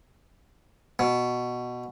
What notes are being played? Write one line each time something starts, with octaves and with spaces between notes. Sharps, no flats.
B2